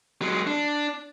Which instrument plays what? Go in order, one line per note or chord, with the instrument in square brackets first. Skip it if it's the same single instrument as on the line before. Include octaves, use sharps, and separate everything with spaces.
[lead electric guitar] F#3 G#3
D4